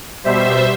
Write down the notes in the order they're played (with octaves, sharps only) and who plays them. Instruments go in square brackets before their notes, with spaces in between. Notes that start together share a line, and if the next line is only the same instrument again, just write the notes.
[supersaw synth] B2 G3 C5 E5